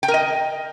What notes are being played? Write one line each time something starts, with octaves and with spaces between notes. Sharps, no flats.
G5
A#4
D#5